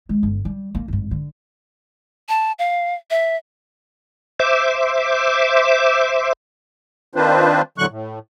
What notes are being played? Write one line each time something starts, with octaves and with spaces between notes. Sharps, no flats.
G#3 C#4
G1
G3
A#3
G#1 G2
D3
A5
F5
E5
C5 E5 D6
D#3 C4 D4 F4 B4 C5
E2 A2 D3 F#3 C#6 F#6
A2